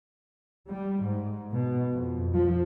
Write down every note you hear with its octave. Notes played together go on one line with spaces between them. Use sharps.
G3
G#2
B2
F2
F3